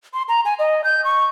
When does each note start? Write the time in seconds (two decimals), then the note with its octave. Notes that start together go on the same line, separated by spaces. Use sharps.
0.14 C6
0.29 A#5
0.45 G#5
0.59 D#5
0.84 G6
1.04 C#6